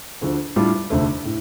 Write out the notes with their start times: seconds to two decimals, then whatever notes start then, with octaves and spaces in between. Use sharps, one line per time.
0.21 D2 D3 F3
0.56 A2 G3 D4 F4
0.90 F1 F2 D3 A3
1.25 A2